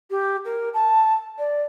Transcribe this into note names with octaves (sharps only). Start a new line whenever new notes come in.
G4
A#4
A5
D5